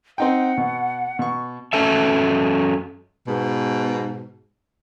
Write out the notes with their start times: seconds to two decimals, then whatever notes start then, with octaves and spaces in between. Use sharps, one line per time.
0.18 C4 D#4 F#5 G5
0.57 B2
1.19 B2 C#6
1.73 F#2 F#3 C#4 A4 E5
3.28 G#2 B2